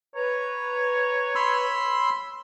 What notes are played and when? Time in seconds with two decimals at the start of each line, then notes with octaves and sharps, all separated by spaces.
0.15 B4 C#5 A#5
1.35 B5 C6 E6